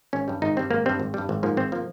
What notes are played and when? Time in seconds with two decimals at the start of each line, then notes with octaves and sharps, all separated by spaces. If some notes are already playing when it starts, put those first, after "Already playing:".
0.13 G#1 C#4
0.28 G2 G3
0.42 G#1 D#4
0.57 G2 G3 C4
0.70 G#1 A#3
0.86 G2 G3 C4
1.00 G#1
1.14 G2 G3
1.29 G#1
1.43 G#2 F3 A#3
1.57 G#1 C4
1.72 F3 A#3